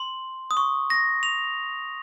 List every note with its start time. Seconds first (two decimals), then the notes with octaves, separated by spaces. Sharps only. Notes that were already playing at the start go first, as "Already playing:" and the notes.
Already playing: C6
0.51 D#6
0.57 C#6
0.90 A#6
1.23 F7